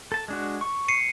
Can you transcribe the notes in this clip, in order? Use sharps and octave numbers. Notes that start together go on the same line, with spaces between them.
A4 A5
G#3 D4 F#4
C#6
C7 C#7 D#7